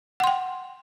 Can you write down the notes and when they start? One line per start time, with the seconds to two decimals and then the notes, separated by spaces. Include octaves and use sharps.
0.20 F#5
0.24 C6
0.27 G5